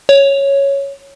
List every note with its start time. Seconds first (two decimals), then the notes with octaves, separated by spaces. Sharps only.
0.09 C#5